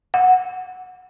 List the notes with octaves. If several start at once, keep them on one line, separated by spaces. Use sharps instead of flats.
F#5